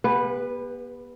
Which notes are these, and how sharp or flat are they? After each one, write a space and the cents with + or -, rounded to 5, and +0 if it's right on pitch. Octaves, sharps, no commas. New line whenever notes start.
B3 -35 G4 +40 B4 +0